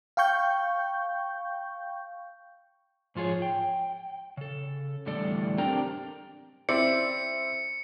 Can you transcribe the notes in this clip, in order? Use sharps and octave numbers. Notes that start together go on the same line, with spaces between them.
F5 G5 C#6 G6
G#2 F3 F4 G#4 C#5
G5
C#3 A4
E2 A2 D3 G3 A4 D5
C4 D4 G4 A#4 G5 A#5
C4 E4 D5 C#7